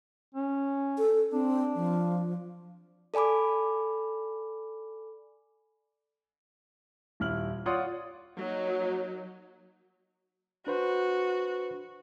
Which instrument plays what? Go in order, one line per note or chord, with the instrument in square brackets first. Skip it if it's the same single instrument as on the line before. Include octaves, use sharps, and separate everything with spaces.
[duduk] C#4
[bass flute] A4
[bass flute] C4 [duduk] D4
[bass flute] F3
[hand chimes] A4 D5 G#5 B5 D6
[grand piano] D#1 E4 F6 F#7
F4 C#5 D5 F#5 C6 D#6
[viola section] F#3 A#3 D#4
[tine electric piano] D4 B4 C5 [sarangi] F#4